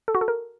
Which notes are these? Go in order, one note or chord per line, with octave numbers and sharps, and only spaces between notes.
A4
F#4
A4
A#4